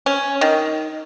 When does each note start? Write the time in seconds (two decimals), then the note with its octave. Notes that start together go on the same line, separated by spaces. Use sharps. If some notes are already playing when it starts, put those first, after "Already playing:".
0.06 C#4
0.41 D#3